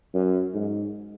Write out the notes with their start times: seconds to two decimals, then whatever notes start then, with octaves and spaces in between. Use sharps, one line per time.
0.14 F#2
0.54 G#2